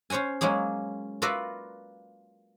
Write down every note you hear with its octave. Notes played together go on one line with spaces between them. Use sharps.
C#4 C5 C#5 F#5 G#5
F#3 G#3 A#3 C#4 G#4
F4 F#4 A#4 B4 D5 E5